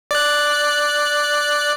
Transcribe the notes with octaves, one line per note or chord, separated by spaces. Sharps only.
D5 F#6